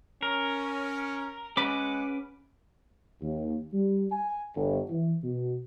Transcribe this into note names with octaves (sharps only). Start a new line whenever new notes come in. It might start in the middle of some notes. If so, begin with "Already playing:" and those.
C#4 A#4
G#3 C#4 B4 F#5 B5 D6
D#2
G3
G#5
G1
E3
B2